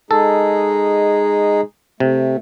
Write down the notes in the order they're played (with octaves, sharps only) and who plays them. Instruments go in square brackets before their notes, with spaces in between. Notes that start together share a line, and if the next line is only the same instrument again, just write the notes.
[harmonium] G#3 D#4 G#4 [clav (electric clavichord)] A4
[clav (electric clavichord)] C3 [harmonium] A3